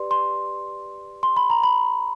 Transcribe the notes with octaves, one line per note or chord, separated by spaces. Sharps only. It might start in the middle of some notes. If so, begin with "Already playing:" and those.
Already playing: G4 B4 D5 C6
C6
C6
B5
A#5
B5